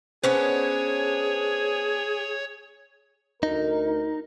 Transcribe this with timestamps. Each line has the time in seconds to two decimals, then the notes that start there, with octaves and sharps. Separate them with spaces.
0.24 B3 C#4 D4 G#4 C5 C#5
3.43 D2 D#4 A#4